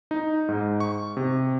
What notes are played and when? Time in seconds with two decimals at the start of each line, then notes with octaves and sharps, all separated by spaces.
0.11 D#4
0.49 G#2
0.80 C#6
1.17 C3